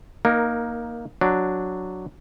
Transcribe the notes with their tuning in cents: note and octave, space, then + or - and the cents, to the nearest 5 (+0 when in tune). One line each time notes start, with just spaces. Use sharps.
A#3 +10 D#4 +0 A#4 -10
F#3 +0 D4 +0